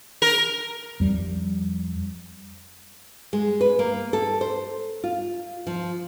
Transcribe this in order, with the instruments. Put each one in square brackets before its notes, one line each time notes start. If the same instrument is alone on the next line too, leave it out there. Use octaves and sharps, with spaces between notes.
[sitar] A#4
[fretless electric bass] F2 G3
[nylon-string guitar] G#3
B4
A#3
A4
C5
F4
F3